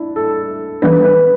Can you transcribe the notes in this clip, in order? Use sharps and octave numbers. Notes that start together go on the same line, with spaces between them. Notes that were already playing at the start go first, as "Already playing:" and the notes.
Already playing: D4 E4
A4
E3 G3 B3 D4 B4
B4